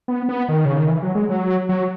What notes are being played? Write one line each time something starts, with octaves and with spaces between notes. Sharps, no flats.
B3
B3
D#3
C#3
D#3
E3
F#3
G#3
F#3
F#3